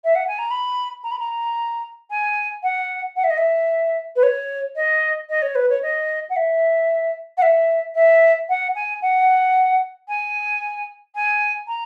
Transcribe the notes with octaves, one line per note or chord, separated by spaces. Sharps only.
E5
F#5
G#5
A#5
B5
A#5
B5
A#5
G#5
F#5
F#5
E5
D#5
E5
B4
C#5
D#5
D#5
C#5
B4
C#5
D#5
F#5
E5
F#5
E5
E5
F#5
G#5
F#5
G#5
G#5
A#5